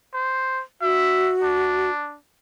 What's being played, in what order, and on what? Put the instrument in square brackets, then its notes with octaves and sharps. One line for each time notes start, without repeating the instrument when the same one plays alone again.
[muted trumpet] C5
[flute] F#4 [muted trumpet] E5
[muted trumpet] D4